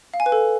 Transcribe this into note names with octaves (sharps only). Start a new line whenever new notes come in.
F5
G#5
B4
A4